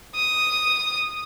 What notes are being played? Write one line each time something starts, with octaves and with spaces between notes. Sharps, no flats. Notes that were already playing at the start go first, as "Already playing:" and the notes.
D#6